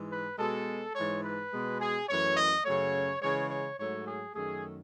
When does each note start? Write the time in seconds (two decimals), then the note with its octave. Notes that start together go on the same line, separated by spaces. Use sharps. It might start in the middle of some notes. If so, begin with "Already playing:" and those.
Already playing: G#2 E3 G#3
0.11 B4
0.39 B2 G#3 A4
0.95 G#2 E3 G#3 C#5
1.24 B4
1.52 B2 G#3
1.80 G#4
2.09 F#2 E3 A3 C#5
2.36 D#5
2.65 F#2 C#3 F#3 A3 C#5
3.21 C#3 E3 G#3 C#5
3.50 C#5
3.78 G#2 F#3 A3 C#5
4.06 G#4
4.35 F#2 D#3 A3 G#4